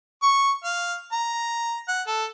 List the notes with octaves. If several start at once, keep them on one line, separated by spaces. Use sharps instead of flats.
C#6
F5
A#5
F#5
A4